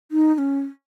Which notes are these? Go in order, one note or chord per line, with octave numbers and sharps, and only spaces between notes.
D#4
D#4
C#4